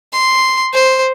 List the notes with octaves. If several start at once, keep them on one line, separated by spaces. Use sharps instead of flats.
C6
C5